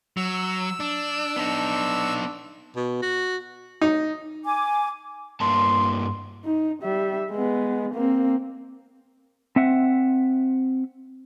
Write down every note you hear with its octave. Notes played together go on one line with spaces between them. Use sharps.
F#3 E6
D4
B3 D4 D#4
B2
F#4
D#4
G#5 D6
G2 A#3 A5 C6
D#4
G3 E5
G#3 B3
A#3 C4
C4 E5 F#5